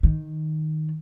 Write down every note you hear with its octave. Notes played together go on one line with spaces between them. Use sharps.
D#3